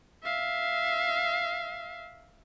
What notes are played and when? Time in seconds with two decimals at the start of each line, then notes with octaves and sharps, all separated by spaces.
0.24 E5 F5